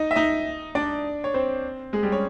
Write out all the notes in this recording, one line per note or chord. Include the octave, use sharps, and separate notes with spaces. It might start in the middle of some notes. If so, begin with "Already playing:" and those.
Already playing: D#4 D#5
E5
D#4 D#5
D4 D5
C#5
C4 C5
G#3 G#4
G3 G4
C#4 C#5